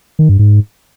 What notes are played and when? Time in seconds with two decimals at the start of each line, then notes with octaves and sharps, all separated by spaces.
0.19 D#3
0.29 G2
0.39 G#2